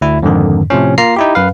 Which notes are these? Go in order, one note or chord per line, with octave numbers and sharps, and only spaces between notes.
D2 E4
F2 G#2 D3 D#3
A2 C3 F3 C#4
A#3 F4 A#5 C7
D#4 E4 G4
F#2 B4 F5